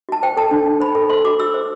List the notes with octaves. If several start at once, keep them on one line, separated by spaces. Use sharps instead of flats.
F#4 A5
C5 G5
A4 A5
D4
D4
C5 B5
A4
C5 C6
F#4 D6
F#4 E6
C5